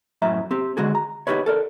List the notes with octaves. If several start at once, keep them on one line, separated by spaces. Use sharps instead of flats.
F#2 A2 E5 A#5
C4 G4
D3 G#3 F#4 G#4
A#5
D#4 F4 G4 B4 C#5
A4 A#4 D5